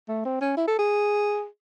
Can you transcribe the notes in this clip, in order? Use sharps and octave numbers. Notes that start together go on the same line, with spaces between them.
A3
C4
C#4
E4
A4
G#4